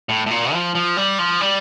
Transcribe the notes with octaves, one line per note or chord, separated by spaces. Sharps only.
A2
A2
A#2
F3
F3
G3
F3
G3